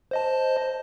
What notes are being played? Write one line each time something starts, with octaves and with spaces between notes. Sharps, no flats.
C5 D#5 A5